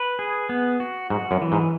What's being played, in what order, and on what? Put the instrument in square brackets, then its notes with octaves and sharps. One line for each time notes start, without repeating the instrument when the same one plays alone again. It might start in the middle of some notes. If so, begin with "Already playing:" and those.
Already playing: [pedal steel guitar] B4
G#4
B3
F#4
[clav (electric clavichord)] G#2 [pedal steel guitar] F#4
[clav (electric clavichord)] F#2
[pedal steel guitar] E3
[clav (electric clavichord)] G#2